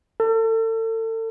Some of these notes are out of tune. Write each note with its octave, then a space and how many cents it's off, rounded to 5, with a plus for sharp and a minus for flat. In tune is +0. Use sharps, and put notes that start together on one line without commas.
A4 +35